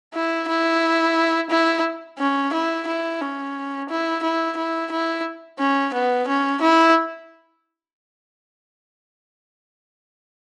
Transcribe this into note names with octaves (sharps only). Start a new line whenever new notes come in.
E4
E4
E4
C#4
E4
E4
C#4
E4
E4
E4
E4
C#4
B3
C#4
E4